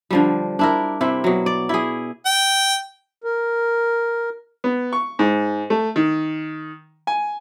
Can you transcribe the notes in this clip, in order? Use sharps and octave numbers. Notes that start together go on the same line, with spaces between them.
D3 F3 G3
D4 E4 A#4
C3 C4 E4
B2 F#3
D5
E4 G#4
G5
A#4
B3
C#6
G#2
A3
D#3
G#5